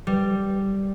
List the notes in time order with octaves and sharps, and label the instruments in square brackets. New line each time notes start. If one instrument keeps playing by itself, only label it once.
[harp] G3